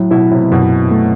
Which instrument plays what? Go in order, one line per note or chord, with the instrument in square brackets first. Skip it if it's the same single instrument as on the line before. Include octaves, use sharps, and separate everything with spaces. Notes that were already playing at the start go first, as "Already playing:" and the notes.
Already playing: [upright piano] A2 [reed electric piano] F#3
[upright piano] B2 [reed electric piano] E4
[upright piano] A2 C3
[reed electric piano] F#2 [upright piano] B2
[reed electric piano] A3